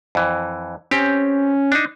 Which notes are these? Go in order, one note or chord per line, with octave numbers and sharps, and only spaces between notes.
F2 E3
C4 C#4 G4
D4 D#4